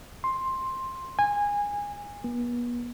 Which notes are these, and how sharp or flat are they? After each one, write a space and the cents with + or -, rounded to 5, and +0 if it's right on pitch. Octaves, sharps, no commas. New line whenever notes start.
C6 +10
G#5 -20
B3 -40